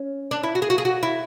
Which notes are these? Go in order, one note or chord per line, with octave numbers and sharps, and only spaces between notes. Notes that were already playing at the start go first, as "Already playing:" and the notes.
Already playing: C#4
D4
E4
F#4
G#4
F#4
G#4
F#4
E4